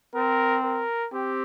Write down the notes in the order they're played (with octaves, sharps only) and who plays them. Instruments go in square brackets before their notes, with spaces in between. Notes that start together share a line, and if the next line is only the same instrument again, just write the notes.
[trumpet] C4 [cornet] A#4
[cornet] A#4
[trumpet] C4 [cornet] G4